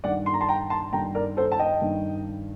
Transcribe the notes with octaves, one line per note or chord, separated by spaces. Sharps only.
G2 D#3 D5 F#5
C6
A#5
A5 C6
G5 A#5
A5 C6
G2 D#3 G5 A#5
A#4 D5
A4 C5
A5
D#5 G5
G2 D#3